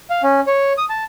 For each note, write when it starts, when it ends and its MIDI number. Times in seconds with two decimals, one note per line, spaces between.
0.10 0.22 77
0.23 0.40 61
0.47 0.73 73
0.78 0.85 87
0.89 1.04 81